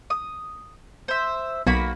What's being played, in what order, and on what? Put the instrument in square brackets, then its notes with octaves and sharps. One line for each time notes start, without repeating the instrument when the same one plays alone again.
[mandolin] D#6
C5 E5
[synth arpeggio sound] B1 [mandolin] A#3 F#4 B5